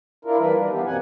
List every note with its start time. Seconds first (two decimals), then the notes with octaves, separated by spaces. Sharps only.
0.25 D4 E4 F4 A#4
0.38 E3 G3 A#3 A#4 B4
0.54 D#3 D4
0.69 E3 F3 B3 G4
0.86 F#2 B2 A#3 C4 F#5 G#5